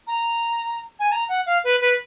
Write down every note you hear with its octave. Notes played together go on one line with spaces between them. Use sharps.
A#5
G#5
A#5
F#5
F5
B4
B4